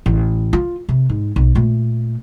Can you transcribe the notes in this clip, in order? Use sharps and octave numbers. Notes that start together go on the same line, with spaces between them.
A1
F4
C3
G#2
B1
A#2 A3